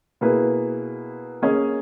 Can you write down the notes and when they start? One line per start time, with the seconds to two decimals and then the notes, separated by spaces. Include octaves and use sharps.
0.21 B2 A#3 E4 G#4 B4
1.42 A#3 C#4 G#4 D#5